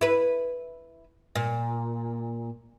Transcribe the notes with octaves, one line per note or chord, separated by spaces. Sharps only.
E4 B4
A#2